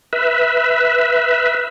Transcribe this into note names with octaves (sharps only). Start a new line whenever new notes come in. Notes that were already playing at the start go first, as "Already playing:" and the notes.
B4 E5